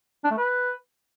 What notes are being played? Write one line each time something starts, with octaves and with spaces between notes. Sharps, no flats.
D4
A3
B4